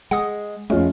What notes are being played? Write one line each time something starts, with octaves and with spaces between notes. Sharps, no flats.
G#3 F#5 D#6
F2 G#3 A3 C#4 F4